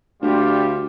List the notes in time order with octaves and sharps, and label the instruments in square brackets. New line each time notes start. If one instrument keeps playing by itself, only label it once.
[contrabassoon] D2 [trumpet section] G3 F4 G4